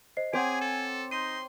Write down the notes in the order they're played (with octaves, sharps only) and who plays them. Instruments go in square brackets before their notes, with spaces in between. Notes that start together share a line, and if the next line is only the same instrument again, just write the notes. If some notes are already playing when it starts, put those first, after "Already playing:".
[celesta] C5 D#5 C7
[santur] C4 C#5 D6 [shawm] G#4 [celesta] F#5 G6 D7 [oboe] G#5
[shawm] A4
[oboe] D#4 [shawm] C6 [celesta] G6 D#7